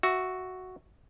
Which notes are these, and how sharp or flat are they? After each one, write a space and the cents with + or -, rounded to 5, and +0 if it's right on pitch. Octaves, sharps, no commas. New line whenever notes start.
F#4 +0 E5 +0